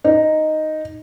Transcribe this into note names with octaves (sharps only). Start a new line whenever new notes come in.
D#4